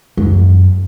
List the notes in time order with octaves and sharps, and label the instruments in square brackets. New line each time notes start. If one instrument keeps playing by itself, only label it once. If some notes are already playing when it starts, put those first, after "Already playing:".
[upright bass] F#2